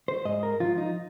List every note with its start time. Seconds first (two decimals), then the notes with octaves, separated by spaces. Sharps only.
0.08 C5
0.25 G#2 D#5
0.43 A#4
0.60 F3 F4
0.78 D#4